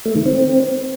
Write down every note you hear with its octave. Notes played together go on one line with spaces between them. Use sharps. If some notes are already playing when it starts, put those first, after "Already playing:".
A3
D#3
C4